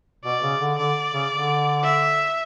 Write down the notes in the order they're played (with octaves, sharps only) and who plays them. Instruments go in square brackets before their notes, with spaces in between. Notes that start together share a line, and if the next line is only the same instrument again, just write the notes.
[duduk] B2 [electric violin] D5
[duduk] C#3
D3
[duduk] D3 [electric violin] D5
[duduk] C#3
D3
[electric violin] E5